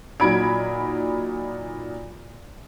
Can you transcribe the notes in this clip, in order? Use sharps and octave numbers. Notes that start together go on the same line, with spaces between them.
A#2 F#3 D#4 B5 G#6 D7